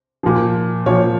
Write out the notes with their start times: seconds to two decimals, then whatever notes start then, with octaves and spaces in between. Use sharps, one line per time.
0.23 A#2 F3
0.86 A#2 F3 C#5